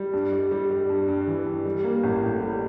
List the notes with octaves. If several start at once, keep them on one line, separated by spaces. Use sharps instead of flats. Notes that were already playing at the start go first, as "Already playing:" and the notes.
Already playing: G3
G2
G3
G3
G3
G2
G2
E3
G2
G3
A#3
A1
A2
G3